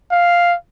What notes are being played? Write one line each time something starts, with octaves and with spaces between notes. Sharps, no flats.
F5